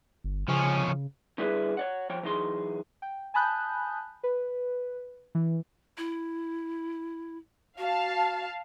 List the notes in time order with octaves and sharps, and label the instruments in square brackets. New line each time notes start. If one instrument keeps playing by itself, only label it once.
[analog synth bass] G1
[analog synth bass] C#3 [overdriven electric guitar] F3 C#4
[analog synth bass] C#3
[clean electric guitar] D3 G3 E4 G#4 B4
C#5 D5 F#5
F3 C#5 G5
E3 F#3 D#4 G#4 C6
[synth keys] G5
G#5 A5 B5 D#6 F#6 G6
B4
E3
[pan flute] E4
[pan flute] F#4 [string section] F5 A5